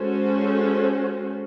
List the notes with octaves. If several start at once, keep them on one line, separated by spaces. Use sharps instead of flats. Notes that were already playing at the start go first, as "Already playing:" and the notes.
Already playing: G#3 C#4 F#4 A4 C5